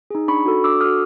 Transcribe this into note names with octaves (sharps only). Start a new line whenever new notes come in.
D#4 G#4
D4 B5 C#6
F#4 A4
D4 D6 E6
F#4 A4 D#6 F6